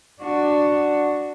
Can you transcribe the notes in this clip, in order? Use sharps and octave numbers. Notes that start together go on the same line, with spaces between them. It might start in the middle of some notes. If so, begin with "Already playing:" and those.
D4 F#4